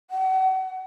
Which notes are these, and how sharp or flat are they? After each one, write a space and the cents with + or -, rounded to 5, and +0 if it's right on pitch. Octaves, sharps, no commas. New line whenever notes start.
F#5 +35